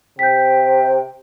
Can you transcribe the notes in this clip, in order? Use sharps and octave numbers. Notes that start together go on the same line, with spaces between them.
C3 G5 G6 B6